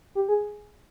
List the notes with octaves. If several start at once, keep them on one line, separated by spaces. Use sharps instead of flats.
G4
G#4